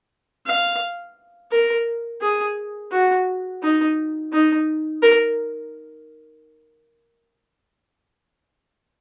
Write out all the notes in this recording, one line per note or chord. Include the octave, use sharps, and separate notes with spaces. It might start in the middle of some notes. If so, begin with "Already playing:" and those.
F5
A#4
G#4
F#4
D#4
D#4
A#4